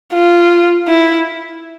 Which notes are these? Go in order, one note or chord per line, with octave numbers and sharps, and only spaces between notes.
F4
E4